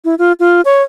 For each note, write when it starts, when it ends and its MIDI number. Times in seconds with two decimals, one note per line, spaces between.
0.05 0.15 64
0.19 0.32 65
0.40 0.61 65
0.65 0.82 73